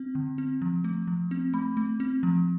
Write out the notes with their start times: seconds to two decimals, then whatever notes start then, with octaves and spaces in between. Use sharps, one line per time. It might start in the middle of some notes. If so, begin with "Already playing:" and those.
Already playing: C4
0.15 D3
0.38 C4
0.62 F3
0.84 A3
1.07 F3
1.31 C4
1.54 A3 B5
1.77 A3
2.00 C4
2.23 F3